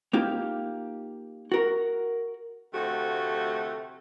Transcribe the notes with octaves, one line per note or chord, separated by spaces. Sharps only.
A#3 D#4 F4 G4
F#4 A#4
D2 C3 F3 A3 F#4